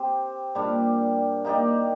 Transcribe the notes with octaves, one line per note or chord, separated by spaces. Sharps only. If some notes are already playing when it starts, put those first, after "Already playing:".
Already playing: C4 G4 C5
A#2 G3 D4 G4
A#3 D#4 G4 D5